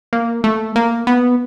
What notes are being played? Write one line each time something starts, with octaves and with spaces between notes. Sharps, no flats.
A#3
A3
A#3
B3